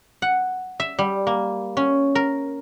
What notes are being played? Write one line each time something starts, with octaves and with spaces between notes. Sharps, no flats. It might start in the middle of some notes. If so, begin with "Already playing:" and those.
F#5
E5
G3
A#3
C#4
A#4